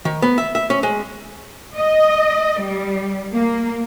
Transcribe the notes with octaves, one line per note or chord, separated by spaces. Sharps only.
D#3
B3
E5
E5
C#4
G#3
D#5
G3
A#3